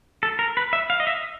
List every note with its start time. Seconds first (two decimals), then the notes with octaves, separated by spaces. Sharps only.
0.23 A4
0.39 A#4
0.57 B4
0.73 E5
0.90 F5
1.00 D#5
1.07 E5